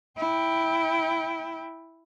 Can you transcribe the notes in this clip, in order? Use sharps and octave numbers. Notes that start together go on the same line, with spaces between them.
E4 G5